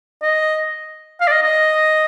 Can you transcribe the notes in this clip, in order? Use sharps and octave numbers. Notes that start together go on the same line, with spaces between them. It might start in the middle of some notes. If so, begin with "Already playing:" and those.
D#5
F5
D5
D#5
D#5